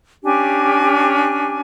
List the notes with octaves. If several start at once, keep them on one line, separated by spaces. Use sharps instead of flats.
C#4 D4 G4 G#5